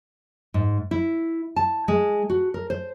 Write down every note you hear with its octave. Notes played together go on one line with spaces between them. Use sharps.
G#2
E4
A5
G#3
F#4
A#4
C5